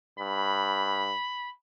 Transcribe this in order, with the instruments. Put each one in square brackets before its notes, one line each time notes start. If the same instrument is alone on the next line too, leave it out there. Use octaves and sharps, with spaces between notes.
[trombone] G2 [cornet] B5